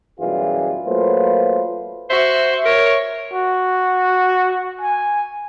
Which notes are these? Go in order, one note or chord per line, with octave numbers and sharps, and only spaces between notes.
F#2 B2 E3 G3 F4 G#4
F#3 A3 A#3 F4 B4 C5
F#4 C5 E5
A#4 C#5
F#4
G#5